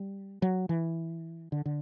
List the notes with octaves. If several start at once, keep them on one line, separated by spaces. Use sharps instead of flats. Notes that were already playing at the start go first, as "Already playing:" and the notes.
Already playing: G3
F#3
E3
D3
D3